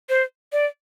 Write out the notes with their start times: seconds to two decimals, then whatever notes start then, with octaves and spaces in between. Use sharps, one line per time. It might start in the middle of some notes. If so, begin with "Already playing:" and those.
0.09 C5
0.53 D5